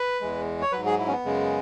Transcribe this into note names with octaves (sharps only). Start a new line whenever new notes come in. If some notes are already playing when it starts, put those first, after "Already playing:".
Already playing: B4
E2 E3 G#3
C#5
G#2 F#3 B4
G#4
E4
C#4
B3
F#2 C#3 G#3